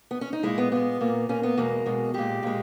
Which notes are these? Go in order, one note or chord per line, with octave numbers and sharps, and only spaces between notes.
B3
C#4
D#4
A#2 G#3 E4
B3
A#2 G#3 B3
A#2 A#3
A#2 A#3 C#4
B3
E2 B2 G#3 A#3
E2 B2 G#3
A#2 G#3 G4
A#2 G#3